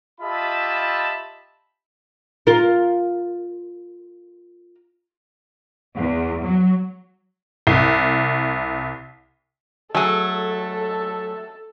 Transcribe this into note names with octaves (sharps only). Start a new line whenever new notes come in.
F4 G4 D#5 E5 A5 B5
F4 A#4
E2
F#3
C2
F#3 A3 G#4 A4